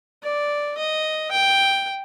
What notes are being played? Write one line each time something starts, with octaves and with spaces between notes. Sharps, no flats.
D5
D#5
G5